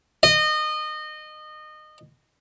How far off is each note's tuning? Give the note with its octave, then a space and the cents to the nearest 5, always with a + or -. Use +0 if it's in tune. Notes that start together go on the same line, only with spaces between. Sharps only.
D#5 -25